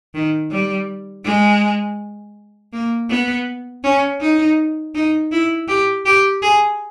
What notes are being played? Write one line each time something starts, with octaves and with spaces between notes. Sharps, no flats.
D#3
G3
G#3
A#3
B3
C#4
D#4
D#4
E4
G4
G4
G#4